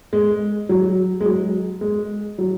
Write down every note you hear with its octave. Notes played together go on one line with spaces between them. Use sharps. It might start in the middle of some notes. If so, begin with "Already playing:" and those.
G#3
F#3
G#3
F#3
G#3
F#3